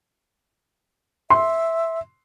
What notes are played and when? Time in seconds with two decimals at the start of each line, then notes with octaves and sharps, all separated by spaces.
1.30 E5 C6